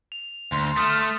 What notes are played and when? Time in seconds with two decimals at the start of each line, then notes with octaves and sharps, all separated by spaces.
0.12 F7
0.52 D2 C6
0.77 A3 D#6 F6 B6 E7